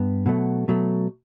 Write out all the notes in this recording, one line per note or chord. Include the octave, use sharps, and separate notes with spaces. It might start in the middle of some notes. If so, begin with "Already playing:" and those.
Already playing: G2 B3
B2 F#3 A3
B2 F#3 A3